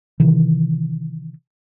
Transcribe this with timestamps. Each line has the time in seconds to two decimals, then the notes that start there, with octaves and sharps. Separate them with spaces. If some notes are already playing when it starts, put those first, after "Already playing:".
0.20 C3 D#3 E3